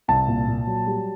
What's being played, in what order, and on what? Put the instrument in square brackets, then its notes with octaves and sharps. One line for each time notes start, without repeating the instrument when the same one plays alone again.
[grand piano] C2 A5
A#2
A#2
F#3
G3